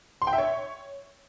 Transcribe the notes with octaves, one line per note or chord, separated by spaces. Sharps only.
C6
G5
E5
C#5